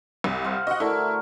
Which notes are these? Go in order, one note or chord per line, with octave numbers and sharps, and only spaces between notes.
C2
C5 F5 F#5
F#4 D#5 F#5
D3 A3 E4 A#4